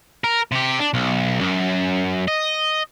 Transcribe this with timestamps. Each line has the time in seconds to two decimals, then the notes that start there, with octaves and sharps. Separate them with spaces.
0.24 A#4
0.52 C3 G4
0.79 D4
0.94 B1
1.41 F#2
2.28 D#5